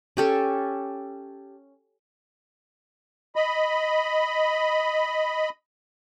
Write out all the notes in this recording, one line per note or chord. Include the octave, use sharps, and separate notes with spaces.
C#4 G4 A4
D#5 B5